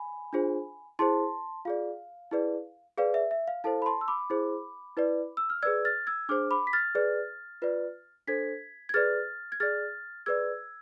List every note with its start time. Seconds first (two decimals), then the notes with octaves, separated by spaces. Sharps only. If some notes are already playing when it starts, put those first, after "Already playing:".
Already playing: G#5 B5
0.33 D4 F4 G#4 C5
0.99 E4 G#4 C5 A5 C6
1.65 F4 G#4 D5 F5
2.31 E4 G#4 B4 D5
2.98 G#4 B4 D5 F5
3.14 E5
3.31 E5
3.48 F5
3.64 E4 A4 C5 F5 A5
3.82 B5
3.86 A5 C6
4.01 E6
4.08 B5 D6
4.30 E4 G#4 C5
4.97 E4 B4 D5
5.37 E6
5.50 F6
5.63 G#4 B4 D5 E6 G#6
5.85 F6 A6
6.07 E6 G#6
6.29 D4 G#4 C5 D6 F6
6.51 B5 D6
6.67 B6
6.73 F6 A6
6.95 G#4 B4 D5
7.62 F4 B4 D5
8.27 D4 A4 C5 G#6 B6
8.89 G#6
8.94 G#4 B4 D5 F6 A6
9.52 G#6
9.60 G#4 D5 F6 A6
10.26 G#4 B4 D5 E6 G#6